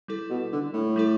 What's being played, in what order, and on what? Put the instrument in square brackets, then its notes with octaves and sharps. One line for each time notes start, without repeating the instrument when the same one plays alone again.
[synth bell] G3 E4 A4
[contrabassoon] B2
D3
A2
[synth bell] G3 E4 A4